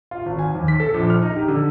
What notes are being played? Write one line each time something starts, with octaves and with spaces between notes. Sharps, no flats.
F4
G#1
G#5
D#2
B6
A4
A#1
F6
D#4
G4
D3